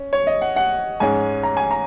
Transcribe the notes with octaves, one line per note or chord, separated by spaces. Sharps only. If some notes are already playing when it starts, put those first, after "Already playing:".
Already playing: C#4
C#5
D#5
F#5
F#5
G#2 G#3 C#4 G#5
A#5
G#5
A#5